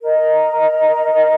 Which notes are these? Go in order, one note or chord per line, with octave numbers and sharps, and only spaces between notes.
A#4 D#5 A#5